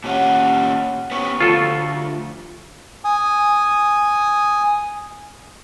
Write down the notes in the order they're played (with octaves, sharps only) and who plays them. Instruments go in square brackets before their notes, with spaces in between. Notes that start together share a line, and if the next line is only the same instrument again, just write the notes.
[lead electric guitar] A#2 C#4 [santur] G4 F#5
[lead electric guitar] B3 C#4 [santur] G4 C#6
[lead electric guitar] D2 [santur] F3 [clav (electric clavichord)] F4 A4
[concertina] G#5 D#6